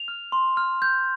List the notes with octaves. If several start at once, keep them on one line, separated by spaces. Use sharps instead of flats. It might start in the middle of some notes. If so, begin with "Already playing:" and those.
Already playing: F7
F6
C6
F6
G6